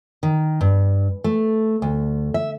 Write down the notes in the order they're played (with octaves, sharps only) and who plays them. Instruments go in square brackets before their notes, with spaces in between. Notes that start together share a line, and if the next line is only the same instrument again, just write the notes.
[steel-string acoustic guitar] D#3
G2
A3
D2
E5